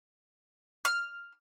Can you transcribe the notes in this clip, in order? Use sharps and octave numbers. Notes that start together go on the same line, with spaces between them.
F6